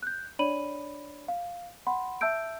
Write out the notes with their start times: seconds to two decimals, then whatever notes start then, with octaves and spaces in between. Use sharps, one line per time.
0.03 F#6 G6
0.39 D4 C#5 D5 B5 D#7 F#7
1.28 F5
1.87 F#5 B5 C6
2.21 E5 A5 E6 G6 D7